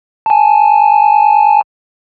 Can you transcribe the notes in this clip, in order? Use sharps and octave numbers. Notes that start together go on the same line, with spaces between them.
G#5 A5